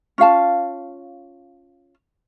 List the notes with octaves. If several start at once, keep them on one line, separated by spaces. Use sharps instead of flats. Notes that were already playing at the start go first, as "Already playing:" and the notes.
C#4 F4 F5 A5